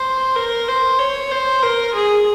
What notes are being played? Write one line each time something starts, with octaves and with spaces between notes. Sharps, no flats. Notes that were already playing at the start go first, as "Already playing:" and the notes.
Already playing: C5
A#4
C5
C#5
C5
A#4
G#4